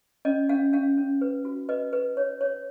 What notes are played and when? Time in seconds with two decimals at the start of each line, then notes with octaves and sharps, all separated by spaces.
0.25 C#4 D#5
0.49 C#4 F5
0.73 C#4 F5
0.98 C#4
1.21 B4
1.45 F#4
1.69 B4 D#5
1.93 B4
2.17 C#5
2.41 C#5